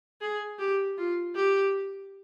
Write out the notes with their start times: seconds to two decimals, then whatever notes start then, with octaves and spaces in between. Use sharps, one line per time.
0.21 G#4
0.59 G4
0.98 F4
1.36 G4